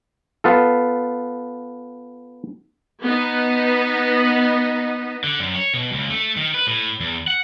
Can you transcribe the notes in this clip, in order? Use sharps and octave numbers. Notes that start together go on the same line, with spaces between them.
B3 F4 A4
B3 D#4
D3
F#2
C#5
B2
C#2
A3
D#3
B4
A2
E2
F#5